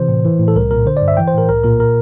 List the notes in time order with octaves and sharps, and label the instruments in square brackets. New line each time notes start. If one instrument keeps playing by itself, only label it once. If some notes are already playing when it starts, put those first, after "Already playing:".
Already playing: [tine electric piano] C3 E3 C5
A2
E3
A2
A4
C2 A#4
A#2 A#4
D3 C5
G2 D5
E5
E3 G5
C5
A2 A#4
C2 A#4
A#2 A#4
A#4